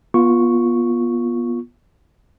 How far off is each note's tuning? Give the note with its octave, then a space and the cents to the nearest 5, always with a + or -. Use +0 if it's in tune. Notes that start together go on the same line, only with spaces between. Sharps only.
B3 -30 F4 +0 C#6 +0